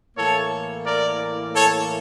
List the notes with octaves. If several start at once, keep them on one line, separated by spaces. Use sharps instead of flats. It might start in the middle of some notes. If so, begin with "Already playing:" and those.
A2 E3 A#3 A4 C#5
A#4 D5
A4 C#5